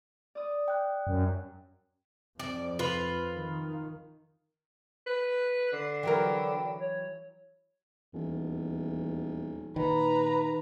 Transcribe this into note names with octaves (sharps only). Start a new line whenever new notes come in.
D5 D#6
G5 F#6
F#2
F2 D5
F4 B4
D#3
B4
D3 C7
E3 F#3 A#4 G5
C#5
D#1 E2
A#2 D#3 B4 A#5